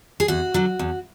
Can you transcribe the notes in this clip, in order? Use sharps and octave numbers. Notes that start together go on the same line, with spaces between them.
G#4
E2 F#4
D3 F#3
E2